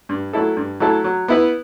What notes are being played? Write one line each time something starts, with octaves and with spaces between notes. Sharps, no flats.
G2
F#3 A3 E4 A4
G2
F#3 A3 E4 A4
F#3
B3 E4 B4